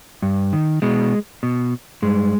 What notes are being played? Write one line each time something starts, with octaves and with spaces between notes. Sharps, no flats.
G2
D#3
B2 G#3
B2
G2 G#3